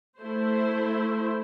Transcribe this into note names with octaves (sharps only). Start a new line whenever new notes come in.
A3 E4 C5